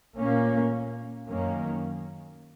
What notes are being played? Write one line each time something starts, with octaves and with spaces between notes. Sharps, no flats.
A#2 A#3 C#4
F#2 D#3 A#3 C#4